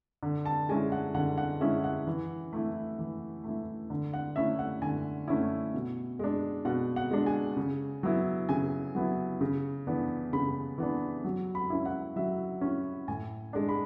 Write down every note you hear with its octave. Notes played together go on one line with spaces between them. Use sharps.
D3
A5
G#3 C#4 E4 G#5
F#5
D3 F#5
F#5
G#3 C#4 E4 E5
F#5
E3
A3 E4
E3
A3 E4
D3
F#5
A3 C#4 E4 E5
F#5
D3 G#5
A3 C#4 E4
B2
G#3 D4
B2 F#5
F#5
G#3 D4
G#5
C#3
F#3 B3 E4
C#3 G#5
F#3 B3 E4
C#3
E3 B3 D4
C#3 B5
E3 B3 D4
F#3
B5
C#4 E4
F#5
F#3 E5
C#4 E4
A2 G#5
G#3 D4
B5